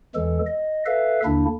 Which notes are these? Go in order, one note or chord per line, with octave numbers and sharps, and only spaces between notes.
E2 E3 G#3 A4
D#5
A4 B4 E5 F5
D#2 D3 A#3 D4 E4